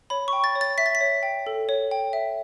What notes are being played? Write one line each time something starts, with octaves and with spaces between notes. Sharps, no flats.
C#5 B5
C#6
G5
A6
C#5
A6
E5 B6
A6
B6
C#5
G5
A4
C#5
G5
E5